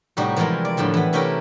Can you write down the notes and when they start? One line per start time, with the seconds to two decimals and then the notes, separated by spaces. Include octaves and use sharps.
0.17 A2 C3 G3 D#4 F#4
0.36 E3 F3 G3 G#3 F4 A#4
0.65 D5
0.77 F2 A2 D3 F3 G3
0.94 E3 B3
1.13 C3 A3 C#4 E4 G4 A#4